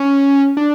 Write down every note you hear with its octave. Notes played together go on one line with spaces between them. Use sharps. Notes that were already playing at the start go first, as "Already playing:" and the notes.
Already playing: C#4
D4